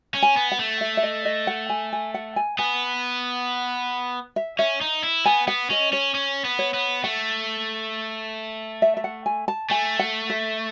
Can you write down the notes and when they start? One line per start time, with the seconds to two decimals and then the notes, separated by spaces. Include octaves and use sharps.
0.15 C#4
0.22 G#5
0.37 B3
0.52 F#5
0.59 A3
0.81 E5
0.97 E5
1.03 D#5
1.25 D#5
1.47 F#5
1.69 G#5
1.93 G#5
2.14 F#5
2.36 G#5
2.58 B3 G#5
4.36 E5
4.59 C#4 E5
4.81 D#4
5.03 E4
5.25 B3 G#5
5.48 B3 F#5
5.70 C#4 D#5
5.92 C#4 C#5
6.15 C#4
6.45 B3
6.59 C#5
6.74 B3
7.04 A3 F#5
8.82 E5
8.97 E5
9.04 F#5
9.26 G#5
9.48 A5
9.70 A3 G#5
9.99 F#5
10.30 E5